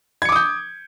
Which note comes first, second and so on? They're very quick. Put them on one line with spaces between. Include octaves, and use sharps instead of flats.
G#6 C#7 D6 D#6 G6